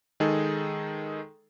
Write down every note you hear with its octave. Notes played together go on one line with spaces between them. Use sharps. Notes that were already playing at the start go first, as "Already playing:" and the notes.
D#3 G#3 D#4 G#4 A4